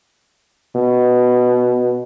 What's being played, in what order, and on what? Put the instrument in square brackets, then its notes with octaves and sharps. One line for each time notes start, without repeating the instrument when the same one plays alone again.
[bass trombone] B2